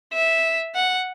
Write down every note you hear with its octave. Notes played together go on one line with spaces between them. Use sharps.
E5
F#5